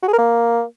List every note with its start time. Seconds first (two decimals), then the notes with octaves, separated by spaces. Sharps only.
0.03 F#4
0.08 G#4
0.13 A#4
0.19 A#3